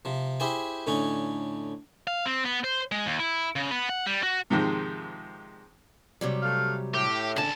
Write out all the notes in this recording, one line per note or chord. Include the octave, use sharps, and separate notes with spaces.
C3 F3
E4 G4 G#4 C5 G5 G#5
A2 D3 C#4 D#4 G#5
F5
C4
B3
C5
G#3
D#2
E4
C#3
B3
F#5
G3
F#4
G#2 C3 D#3 F3 G#3
C3 F#3 G3
A3 F5
A2 G4
C#2 D3 G#5 A5